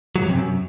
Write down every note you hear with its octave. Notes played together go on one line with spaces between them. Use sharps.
F#3
F#2
C3
F#2